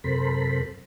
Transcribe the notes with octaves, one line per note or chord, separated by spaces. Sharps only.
F#2 C3 A4 A#4 C5 B5